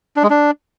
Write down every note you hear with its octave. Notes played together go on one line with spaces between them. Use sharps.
D4
G#3
D4